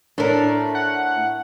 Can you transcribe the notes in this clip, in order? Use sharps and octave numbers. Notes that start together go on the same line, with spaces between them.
A2 A3 D4 A#4
F#5